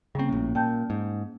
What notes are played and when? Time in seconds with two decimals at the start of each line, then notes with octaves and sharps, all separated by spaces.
0.15 C#3 G3 A#3 C4 C#4
0.29 A#1 A2
0.55 A#2 G5 A5 G6
0.90 G#2